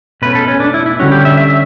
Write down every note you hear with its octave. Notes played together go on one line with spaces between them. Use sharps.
B2 A3 C#4 B4
A4
C#4
D4
E4
E4
D3 G3 C#4 F#4
G4
E5
E5